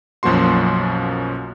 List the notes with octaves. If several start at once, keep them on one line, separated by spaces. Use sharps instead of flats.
B1 F#2 F3 A#3 F#4 C6